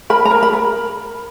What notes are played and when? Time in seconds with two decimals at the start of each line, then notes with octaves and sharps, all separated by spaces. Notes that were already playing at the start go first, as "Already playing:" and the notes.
0.10 A#4 B5
0.25 A#5
0.31 A#4
0.43 B5
0.53 A#4